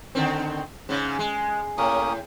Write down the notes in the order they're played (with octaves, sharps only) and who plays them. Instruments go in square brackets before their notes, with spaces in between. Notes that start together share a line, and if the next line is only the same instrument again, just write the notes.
[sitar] D3 D#3 C4
G#2 C#3
G#3
[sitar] A2 [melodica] A#3 C#4 D#6